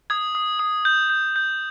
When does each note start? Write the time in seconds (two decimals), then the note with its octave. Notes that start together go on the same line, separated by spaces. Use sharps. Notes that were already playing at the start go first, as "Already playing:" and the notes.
0.10 D#6 G#6
0.35 D#6
0.59 D#6
0.85 G6
1.10 G6
1.36 G6